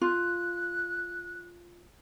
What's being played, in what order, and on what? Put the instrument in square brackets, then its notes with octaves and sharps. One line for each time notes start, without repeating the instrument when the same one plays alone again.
[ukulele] F4 [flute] F#6